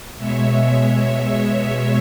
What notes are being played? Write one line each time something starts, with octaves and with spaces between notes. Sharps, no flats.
B2 G#3 C#5 E5